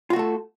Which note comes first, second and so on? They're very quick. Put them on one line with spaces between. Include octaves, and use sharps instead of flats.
F4 F#4 A3 A4